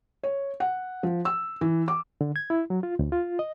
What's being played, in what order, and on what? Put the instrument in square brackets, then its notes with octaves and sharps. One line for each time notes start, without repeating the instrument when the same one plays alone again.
[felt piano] C#5
F#5
F3
E6
E3
D6
[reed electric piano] D3
G#6
E4
F#3
F4
D2
F4
D#5